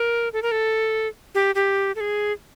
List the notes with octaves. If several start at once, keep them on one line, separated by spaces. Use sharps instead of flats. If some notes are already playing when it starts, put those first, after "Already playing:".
Already playing: A#4
A4
A#4
A4
G4
G4
A4
G#4